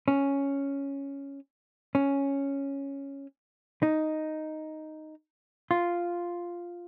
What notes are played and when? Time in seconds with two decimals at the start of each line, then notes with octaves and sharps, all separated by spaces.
0.08 C#4
1.95 C#4
3.83 D#4
5.71 F4